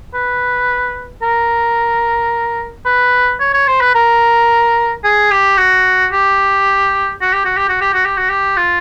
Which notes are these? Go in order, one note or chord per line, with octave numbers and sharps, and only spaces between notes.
B4
A#4
B4
C#5
C#5
C5
B4
A#4
G#4
G4
F#4
G4
F#4
G4
F#4
G4
F#4
G4
F#4
G4
F#4
G4
F4